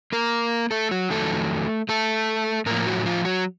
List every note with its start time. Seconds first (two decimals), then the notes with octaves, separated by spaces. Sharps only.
0.12 A#3 A#4
0.71 A3 A4
0.91 F#3 F#4
1.10 F2 D#3 F#3 A3 A4
1.89 A3 A4
2.66 A2 F3 A#3 A#4
2.86 F#3 F#4
3.06 F3 F4
3.25 F#3 F#4